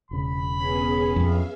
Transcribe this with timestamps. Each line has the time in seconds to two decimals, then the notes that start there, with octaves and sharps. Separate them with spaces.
0.11 E1 C#3 B5
0.57 B3 C#4 G#4
1.16 F2 E5 F5